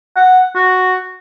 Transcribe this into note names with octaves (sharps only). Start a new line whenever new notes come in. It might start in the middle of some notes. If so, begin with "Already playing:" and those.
F#5
F#4